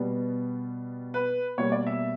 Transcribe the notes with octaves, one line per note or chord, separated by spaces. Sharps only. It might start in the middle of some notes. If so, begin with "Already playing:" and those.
Already playing: B2 G3 B3
B4
B2 G3 A#3 C#5
D5
E5